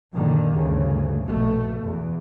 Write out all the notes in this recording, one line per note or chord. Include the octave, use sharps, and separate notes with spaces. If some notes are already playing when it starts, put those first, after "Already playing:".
F#2 A#2 D3 D#3
D2 G2 C#3
A#1 B2 A3
E2